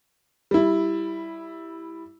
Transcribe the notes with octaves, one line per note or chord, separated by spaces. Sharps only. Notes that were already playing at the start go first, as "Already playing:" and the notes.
G3 E4